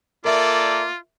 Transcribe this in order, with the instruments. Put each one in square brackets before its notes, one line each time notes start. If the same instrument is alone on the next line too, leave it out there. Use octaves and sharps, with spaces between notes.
[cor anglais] A#3 [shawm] F4 [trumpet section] A4 D5 [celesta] A#4 E5